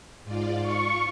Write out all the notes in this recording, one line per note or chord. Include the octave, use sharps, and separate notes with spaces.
G#2 F4 D5
F4 C#6